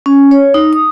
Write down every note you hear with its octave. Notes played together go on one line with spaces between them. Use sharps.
C#4
C#5
D#4
D#6